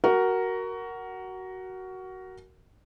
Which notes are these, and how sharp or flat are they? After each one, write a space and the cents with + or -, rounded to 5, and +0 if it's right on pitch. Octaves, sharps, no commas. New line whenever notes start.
F#4 +15 A#4 +0